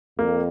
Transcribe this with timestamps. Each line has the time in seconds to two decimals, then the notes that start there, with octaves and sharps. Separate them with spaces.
0.19 F2 A#3